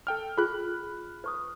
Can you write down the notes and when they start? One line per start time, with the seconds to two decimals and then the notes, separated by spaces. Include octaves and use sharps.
0.07 A4 G5 F6
0.38 F4 G#4 B5 F#6
1.24 B4 C#6 D#6